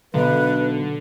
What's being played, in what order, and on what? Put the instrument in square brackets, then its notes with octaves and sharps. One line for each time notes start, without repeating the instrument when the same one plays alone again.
[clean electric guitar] B1 [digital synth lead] D3 [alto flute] B4